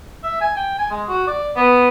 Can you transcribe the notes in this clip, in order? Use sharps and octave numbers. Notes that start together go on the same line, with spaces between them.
E5
G#5
G5
G#5
G#3
F#4
D5
B3